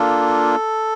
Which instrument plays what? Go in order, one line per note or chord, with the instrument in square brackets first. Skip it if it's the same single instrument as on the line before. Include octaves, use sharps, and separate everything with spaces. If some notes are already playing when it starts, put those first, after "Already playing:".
Already playing: [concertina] A#3 D4 F4 A4